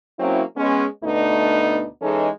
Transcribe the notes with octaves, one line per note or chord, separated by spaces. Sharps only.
F#3 A#3 C4 C#4 E4
G#3 B3 C#4
D2 B2 A3 B3 D4 D#4
E3 G#3 C#4 D#4 G#4 A4